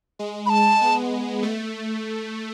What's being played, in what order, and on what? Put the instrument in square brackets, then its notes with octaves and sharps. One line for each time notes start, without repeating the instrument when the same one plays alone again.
[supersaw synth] G#3
[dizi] B5
A5
[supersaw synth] B3
A3